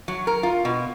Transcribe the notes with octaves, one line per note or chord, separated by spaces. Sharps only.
F#3
A#4
F4
B2